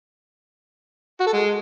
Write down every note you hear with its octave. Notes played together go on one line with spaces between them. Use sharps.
F#4
A4
G#3